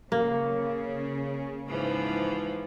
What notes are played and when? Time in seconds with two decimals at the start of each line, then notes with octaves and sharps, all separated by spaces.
0.12 C#3 A#3
1.66 G#2 E3 F3